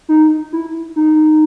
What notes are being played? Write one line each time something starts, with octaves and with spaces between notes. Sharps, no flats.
D#4
E4
D#4